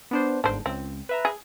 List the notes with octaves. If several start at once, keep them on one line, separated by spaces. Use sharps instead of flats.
B3 D4 C5
G1 G#2 D4 C5
C#2 C4
B4 E5 A#5
G#4